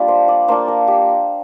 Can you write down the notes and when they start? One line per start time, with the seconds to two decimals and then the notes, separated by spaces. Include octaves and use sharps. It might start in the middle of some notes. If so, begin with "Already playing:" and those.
Already playing: G3 A#3 D4 F4 G4 D5 F5 G5
0.08 C5
0.28 D5
0.48 A#3 D4 F4 C5
0.68 A#4
0.88 G4